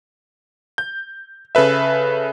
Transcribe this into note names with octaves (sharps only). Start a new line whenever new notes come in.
G6
C#3 A4 B4 E5